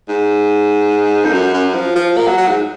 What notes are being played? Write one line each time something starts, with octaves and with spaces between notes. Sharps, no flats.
G#2
F2
F#2
F#2
F3
F3
A#3
F#3
F#3
G#2